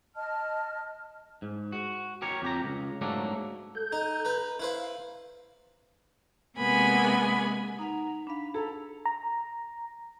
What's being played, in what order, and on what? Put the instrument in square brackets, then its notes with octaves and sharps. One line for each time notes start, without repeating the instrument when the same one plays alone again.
[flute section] D#5 A5 F6
[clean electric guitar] G#2
F#4
G4 A#4 C#5
F2 G4 A#5
C#2
G#2 F#3 A3 A#3 D4
[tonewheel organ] A4 G6
[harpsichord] D#4 D#5
B4 A#5
[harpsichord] E4 B4 C5 [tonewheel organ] F5
[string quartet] C3 G#3 A#3 B3 G#5 B5
[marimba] D#4 F#5 [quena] A#5
[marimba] D4 F5 [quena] B5
[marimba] G#4 [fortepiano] A4 [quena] A#5
[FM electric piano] A#5